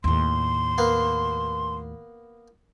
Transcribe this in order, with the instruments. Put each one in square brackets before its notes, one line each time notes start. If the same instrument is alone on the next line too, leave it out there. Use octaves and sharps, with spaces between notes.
[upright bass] D#2 A2 [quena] C6
[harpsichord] A#3 B3